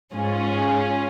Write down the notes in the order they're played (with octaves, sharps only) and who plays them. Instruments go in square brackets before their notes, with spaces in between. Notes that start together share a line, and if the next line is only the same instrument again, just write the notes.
[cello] G#2 [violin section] C#4 F4 G#4